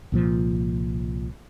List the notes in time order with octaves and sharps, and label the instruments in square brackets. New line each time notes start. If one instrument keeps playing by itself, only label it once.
[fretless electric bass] C2 A#2 F3